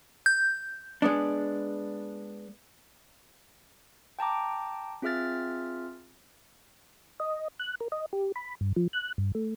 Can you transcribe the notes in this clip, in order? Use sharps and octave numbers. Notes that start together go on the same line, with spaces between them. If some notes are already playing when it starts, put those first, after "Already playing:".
G6
G#3 B3 D4
G5 A5 A#5 D6
C4 F4 G#4 E5 F6 A6
D#5
F#6
A#4
D#5
G4
B5
G2
F3
F#6
G2
A3